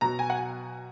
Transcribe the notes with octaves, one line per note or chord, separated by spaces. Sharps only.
B2 F#3 A#5
G#5
F#5